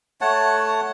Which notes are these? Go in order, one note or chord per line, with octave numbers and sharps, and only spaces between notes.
A3 C#5 F#5 A5